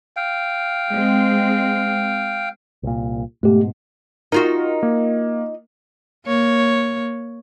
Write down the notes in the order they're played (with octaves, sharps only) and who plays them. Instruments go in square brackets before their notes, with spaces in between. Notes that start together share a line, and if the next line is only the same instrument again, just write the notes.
[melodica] F5 G5
[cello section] G#3 C4
[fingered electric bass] C2 A#2
[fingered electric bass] G#2 B2 [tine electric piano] A3 G4
[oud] D#4 F4 F#4 [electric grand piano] A#4
[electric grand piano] A#3
[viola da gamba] A#3 C#5